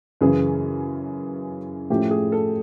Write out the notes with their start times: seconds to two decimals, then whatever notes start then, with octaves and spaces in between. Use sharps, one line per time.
0.21 F#2 C#3 E3 G#4
1.90 A2 F3 A3 C#4 E4 G4
2.11 G#4
2.32 A4